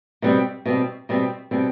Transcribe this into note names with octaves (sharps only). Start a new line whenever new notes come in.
B2 G3 C4
B2 G3 C4
B2 G3 C4
B2 G3 C4